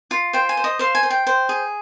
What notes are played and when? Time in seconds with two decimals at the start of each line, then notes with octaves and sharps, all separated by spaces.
0.11 F4
0.33 C5 G5
0.49 G#5
0.57 C5
0.64 D#5
0.79 C5 F5
0.95 G#5
1.03 C5
1.10 G5
1.27 C5
1.49 G#4